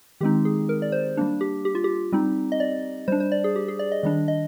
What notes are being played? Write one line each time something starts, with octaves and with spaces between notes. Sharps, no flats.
D#3 G#3 C4 D#4 G4
G#4
A#4
D5
C5
G3 A#3 D4
G4
G4
F4
G4
G3 C4 D#4
D#5
D5
G3 D4 C5
C5
D5
G#4
G4
G#4
D5
D#5
D#3 G3 D4 D#5
D#5